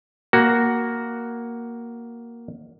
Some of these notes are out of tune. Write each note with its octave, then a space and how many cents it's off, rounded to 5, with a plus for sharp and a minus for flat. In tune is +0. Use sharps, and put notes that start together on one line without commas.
A#3 +5 F#4 +5